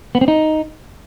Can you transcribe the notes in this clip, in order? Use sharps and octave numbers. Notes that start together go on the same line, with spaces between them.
B3
C4
D#4